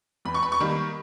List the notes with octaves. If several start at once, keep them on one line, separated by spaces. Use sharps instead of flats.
E2 B5
C#6
B5
C#6
D#3 G3 A#3 B5